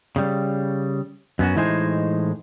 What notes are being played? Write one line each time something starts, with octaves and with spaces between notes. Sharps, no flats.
C#3 G3
F#2 B3 C#4 F#4
A2 E3 G#3 D#4 C5 G#5